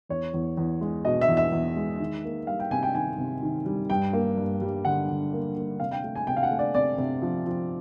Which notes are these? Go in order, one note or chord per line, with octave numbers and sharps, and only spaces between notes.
E2 C#5
E2
E2
G#3
B2 D#5
E5
E2
E5
E2
G#3
D#3
A#3
G3 F5
G5
C3 G#5
G5
D#3 G#5
C3
D#3
G3
G2 G5
A#3
G2
G3
D3 F#5
D3
A#3
A#3
C3 F5
G5
A3
G#5
C3 G5
F5
F#5
A3
D5
C3 D5
C3
F3
F3